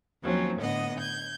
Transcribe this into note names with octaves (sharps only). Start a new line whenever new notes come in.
D#2 F3 F#3 C4 C#4
A2 D3 B3 D#5 F#5
G6 G#6